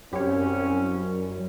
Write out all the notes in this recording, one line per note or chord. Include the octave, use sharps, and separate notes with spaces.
C2 F#2 C#4 G4 C#5